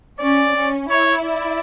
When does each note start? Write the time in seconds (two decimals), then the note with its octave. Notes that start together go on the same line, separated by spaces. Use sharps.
0.20 C#4 D5
0.56 C#4
0.90 E4 C#5
1.25 D5